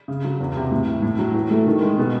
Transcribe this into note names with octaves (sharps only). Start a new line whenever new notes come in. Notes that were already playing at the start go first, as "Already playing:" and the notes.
C#3
F#3
E2
C3
A2
E3
A2
F#3
E3
A3
D#3
G#3
B2